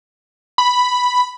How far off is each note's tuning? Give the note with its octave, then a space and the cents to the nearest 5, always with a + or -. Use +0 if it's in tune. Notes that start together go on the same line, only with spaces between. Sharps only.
B5 +0